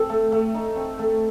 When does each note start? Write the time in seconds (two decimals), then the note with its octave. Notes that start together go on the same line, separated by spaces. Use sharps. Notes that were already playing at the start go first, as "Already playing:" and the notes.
Already playing: C4 A4
0.10 A3
0.32 A3
0.54 D#4
0.76 C4
0.99 A3